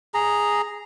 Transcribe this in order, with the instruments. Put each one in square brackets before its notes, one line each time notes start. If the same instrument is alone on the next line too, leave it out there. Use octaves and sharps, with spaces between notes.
[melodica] G#4 A#5